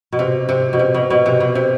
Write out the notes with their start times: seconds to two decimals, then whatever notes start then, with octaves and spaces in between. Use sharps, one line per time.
0.12 B2
0.19 C3
0.49 C3
0.73 B2
0.79 C3
0.94 B2
1.10 B2
1.26 C3
1.40 B2
1.55 C3